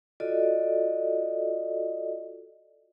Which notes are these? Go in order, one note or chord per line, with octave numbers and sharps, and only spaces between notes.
F4 F#4 A4 D5 D#5